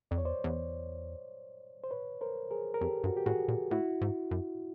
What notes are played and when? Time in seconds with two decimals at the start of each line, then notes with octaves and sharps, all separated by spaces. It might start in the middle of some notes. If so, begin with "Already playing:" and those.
0.11 F2 D5
0.18 C#5
0.22 E2 C5 D5
0.44 E2
1.84 C5
1.91 B4 C#5
2.21 A#4 C5
2.51 G#4 A#4
2.74 A#4
2.81 F2 G4 A4
3.04 G2 F#4
3.17 G4
3.26 A2 F#4 G#4
3.48 A#2
3.71 A2 E4 F#4
4.01 G#2
4.31 F#2